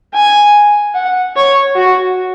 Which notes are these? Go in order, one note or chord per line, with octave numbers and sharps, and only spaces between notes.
G#5
F#5
C#5
F#4